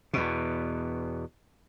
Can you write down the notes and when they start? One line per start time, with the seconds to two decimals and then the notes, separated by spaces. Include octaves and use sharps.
0.13 E2 B2